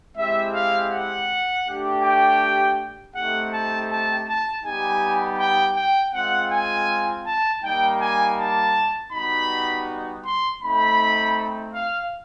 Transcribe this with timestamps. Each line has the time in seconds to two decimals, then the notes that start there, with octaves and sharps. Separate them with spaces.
0.16 G#3 C4 E4 G4 E5
0.53 F5
0.90 F#5
1.65 A3 D4 G4
2.02 G5
3.14 A3 C4 D#4 G4 F#5
3.52 A5
3.89 A5
4.27 A5
4.64 G3 B3 D#4 G4 G#5
5.38 G5
5.76 G5
6.13 G#3 C4 F4 F#5
6.51 G#5
7.26 A5
7.62 G3 A#3 D#4 G5
8.00 G#5
8.37 A5
9.12 G3 B3 D#4 F#4 B5
10.24 C6
10.61 A3 C4 D#4 B5
11.73 F5